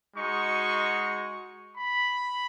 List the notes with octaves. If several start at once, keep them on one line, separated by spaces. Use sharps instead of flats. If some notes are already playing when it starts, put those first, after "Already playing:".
G#3 D#4 F#4 C#6
B5